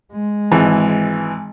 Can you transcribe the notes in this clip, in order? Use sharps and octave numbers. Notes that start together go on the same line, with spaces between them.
G#3
G#1 E3